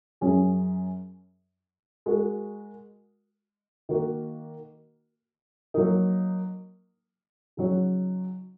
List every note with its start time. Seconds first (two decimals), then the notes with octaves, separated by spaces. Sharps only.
0.21 F#2 F#3 C#4 G#4
2.06 G#3 F#4 A#4
3.89 D#3 A#3 F#4 A#4
5.74 F#3 A#3 D#4 A#4
7.57 C#3 F#3 D#4 F#4 C#5